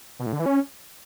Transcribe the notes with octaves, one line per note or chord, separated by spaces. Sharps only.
B2
A2
D3
E3
C#4